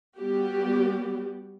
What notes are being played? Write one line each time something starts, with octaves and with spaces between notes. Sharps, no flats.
G3 B3 F#4 G4